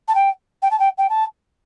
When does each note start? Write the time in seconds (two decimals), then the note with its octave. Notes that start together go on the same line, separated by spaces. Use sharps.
0.08 A5
0.15 G5
0.62 G5
0.71 A5
0.80 G5
0.98 G5
1.10 A5